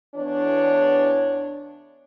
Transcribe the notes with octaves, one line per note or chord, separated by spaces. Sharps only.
E2 D4 C#5